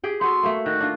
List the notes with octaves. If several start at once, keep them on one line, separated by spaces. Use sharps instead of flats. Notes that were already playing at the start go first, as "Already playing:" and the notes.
G4 G#4 G5
B3 F#4 A4 C6
A3 A#3
D#3 F#4
D4 F4